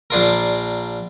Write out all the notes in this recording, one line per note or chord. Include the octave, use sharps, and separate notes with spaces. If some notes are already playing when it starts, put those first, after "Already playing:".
A#1 D4 F4 A#4